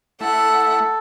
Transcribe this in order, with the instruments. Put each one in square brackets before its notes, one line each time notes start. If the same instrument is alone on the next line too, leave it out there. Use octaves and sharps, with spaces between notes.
[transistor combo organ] A3 E4 [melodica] A4 [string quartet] F#5